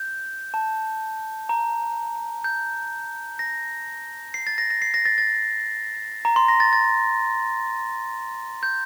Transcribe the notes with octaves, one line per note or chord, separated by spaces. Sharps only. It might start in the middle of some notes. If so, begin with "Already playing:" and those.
Already playing: G6
A5
A#5
G6
A#6
C7
A6
A#6
A#6
C7
A#6
A6
A6
A#5
C6
A#6
A6
A6
G6